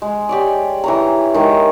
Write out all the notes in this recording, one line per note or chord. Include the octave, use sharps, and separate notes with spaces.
G#3
G4 C#5 D5
E3 C#5 A#5
D#3 G#3